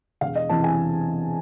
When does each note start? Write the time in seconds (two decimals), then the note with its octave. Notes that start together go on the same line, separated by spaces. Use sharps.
0.21 E1 F5
0.36 D#5
0.49 E2 C3 E3 A5
0.64 G#5